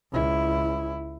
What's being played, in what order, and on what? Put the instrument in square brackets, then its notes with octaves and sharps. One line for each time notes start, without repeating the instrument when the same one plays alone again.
[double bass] C#2 E4